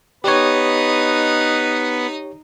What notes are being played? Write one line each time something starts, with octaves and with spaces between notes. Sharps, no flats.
B3 D#4 G4 B4 C#5 D#5